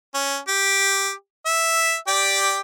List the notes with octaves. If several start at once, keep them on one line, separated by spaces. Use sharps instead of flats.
C#4
G4
E5
G4 D5 G5